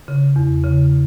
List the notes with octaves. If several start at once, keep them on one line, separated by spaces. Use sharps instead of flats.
C#3
E2
C#3